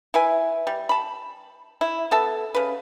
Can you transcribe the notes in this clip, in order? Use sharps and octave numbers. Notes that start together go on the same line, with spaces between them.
E4 B4 G#5
G3
A5 B5
E4
B3 A4 E5 A5
C#3 B4